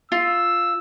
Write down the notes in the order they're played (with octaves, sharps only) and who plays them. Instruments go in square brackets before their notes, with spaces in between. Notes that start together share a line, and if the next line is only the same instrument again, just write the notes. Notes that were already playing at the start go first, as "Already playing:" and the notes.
[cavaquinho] F4 [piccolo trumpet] E6